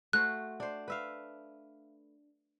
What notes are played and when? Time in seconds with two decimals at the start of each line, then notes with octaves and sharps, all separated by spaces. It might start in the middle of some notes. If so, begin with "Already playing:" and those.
0.13 A3 F#4 C5 F#6
0.60 D4 C5
0.88 B4 E5 F5